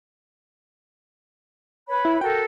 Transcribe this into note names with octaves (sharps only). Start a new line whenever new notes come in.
B4 C#5 B5
E4
F#4 A4 A#4 G5